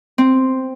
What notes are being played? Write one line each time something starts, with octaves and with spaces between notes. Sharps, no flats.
C4